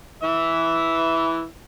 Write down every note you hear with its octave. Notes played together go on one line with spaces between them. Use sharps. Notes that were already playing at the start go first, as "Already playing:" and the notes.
E3 E5